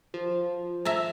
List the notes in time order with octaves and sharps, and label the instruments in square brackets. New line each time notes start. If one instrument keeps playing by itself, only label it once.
[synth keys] F3
[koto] E5 A5 A#5